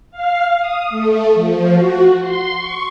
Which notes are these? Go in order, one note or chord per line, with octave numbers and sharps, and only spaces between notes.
F5
D#6
A3
F3
F#4
C6
C#6